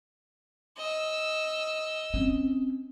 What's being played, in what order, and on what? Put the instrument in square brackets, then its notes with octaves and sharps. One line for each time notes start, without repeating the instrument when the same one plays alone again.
[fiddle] D#5 E6
[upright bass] C4 C#4